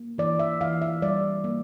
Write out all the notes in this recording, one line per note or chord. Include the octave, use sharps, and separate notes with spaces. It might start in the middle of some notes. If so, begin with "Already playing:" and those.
Already playing: A#3
E3 D5
E5
E3 F5
E5
G3 D5
A#3